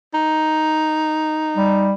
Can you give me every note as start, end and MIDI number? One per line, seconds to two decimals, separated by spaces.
0.14 1.92 63
1.57 1.92 55